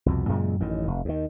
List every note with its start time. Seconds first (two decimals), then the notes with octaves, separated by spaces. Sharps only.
0.06 C2 F2 B2
0.29 F#2 A#2 C#3 G#3
0.60 A1 F#2 D#3
0.87 F1
1.05 D#2 D#3